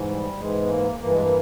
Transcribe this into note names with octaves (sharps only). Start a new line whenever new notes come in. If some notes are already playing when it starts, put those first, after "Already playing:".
Already playing: G#2 E3
G3
G#2 E3 G#3
B3
A#3
G2 E3 A#3
G#3
A#3